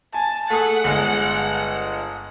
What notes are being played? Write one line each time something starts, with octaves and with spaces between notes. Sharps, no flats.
G#5 A5
A3 G#4 F#5
G1 G#3